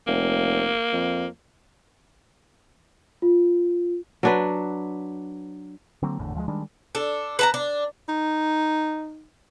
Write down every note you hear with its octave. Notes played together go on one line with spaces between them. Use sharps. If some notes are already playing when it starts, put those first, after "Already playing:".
F1 A#3
F2
F4
F#3 D4 B4
D3 F#3 A#3 C4
G#1 E2 A2 D3
D2 F3 G3 G#3
D#3 G3 G#3 D4
D4 A4
B4 A5 A#5
D4
D#4